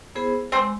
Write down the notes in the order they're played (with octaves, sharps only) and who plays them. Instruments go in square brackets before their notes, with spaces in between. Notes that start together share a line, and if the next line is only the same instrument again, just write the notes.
[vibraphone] B3 E4 G#4 C5
[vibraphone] G#3 [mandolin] C4 C5